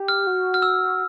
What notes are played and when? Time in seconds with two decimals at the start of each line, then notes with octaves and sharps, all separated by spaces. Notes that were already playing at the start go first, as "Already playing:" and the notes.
Already playing: G4
0.08 F6
0.27 F#4
0.54 F6
0.62 E6